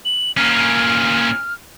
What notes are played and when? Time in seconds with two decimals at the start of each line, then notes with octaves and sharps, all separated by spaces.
0.05 F#7
0.37 A#2 C#4 F6